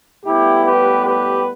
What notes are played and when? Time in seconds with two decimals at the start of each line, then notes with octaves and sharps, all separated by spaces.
0.24 A2 G3 B3 E4 G4
0.66 G4 B4
1.06 G4 B4